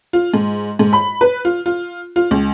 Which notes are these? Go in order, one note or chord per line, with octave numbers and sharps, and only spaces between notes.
F4
G#2
G#2
B5
B4
F4
F4
F4
C#2